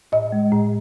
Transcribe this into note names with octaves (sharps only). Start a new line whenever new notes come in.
A2 D#5
G#3
A2